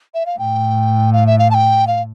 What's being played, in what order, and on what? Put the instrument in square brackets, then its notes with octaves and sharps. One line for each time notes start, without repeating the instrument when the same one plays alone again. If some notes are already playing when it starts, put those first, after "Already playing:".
[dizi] E5
F5
[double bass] A2 [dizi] G5
[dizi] F5
E5
F5
A5
G5
F5